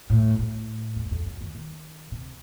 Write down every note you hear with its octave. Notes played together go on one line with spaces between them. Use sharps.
A2
F#2
A2
F2
F#2
F2
F#2
D#3
D#3
C3